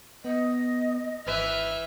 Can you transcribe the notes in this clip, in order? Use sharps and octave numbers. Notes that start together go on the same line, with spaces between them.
B3 D#5
G#1 E3 B4 E5 F6